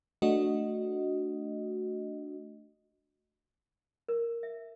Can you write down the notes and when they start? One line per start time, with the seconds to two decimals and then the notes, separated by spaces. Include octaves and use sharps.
0.22 A3 D4 F#4 D#5
4.08 A#4
4.43 E5